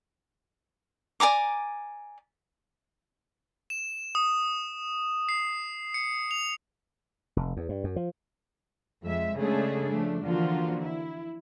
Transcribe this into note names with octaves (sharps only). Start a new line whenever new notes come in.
D5 G#5 A#5 D6
E7
D#6
C7
C#7
F7
F1
E2
G2
F#2
F3
F2 G#3 E5
C#3 G#3 A3 D4 G#4 A4
F3 A3 D4
D3 E3 F3 A#3 F4 F#4
E4